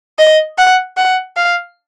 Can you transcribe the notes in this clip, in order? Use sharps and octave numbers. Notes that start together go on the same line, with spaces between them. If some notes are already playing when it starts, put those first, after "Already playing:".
D#5
F#5
F#5
F5